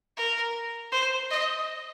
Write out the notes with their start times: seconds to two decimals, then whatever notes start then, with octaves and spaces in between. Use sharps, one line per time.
0.17 A#4
0.92 C5
1.31 D#5